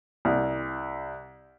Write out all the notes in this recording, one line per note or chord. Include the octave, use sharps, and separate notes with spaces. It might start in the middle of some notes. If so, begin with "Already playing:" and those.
C2